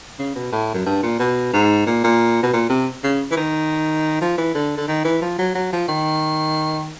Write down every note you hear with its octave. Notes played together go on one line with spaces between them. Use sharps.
C#3
B2
A2
F#2
G2
A#2
B2
G#2
A#2
A#2
B2
A#2
C3
C#3
E3
D#3
F3
E3
D3
D3
D#3
E3
F3
F#3
F#3
F3
D#3